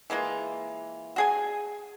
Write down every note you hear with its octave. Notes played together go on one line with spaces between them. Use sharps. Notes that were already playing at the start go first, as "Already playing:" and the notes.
E3 G#3 A#3 F4
F#4 G#4 G#5